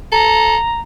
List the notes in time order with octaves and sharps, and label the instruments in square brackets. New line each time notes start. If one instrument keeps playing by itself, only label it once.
[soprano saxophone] A4 [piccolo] A#5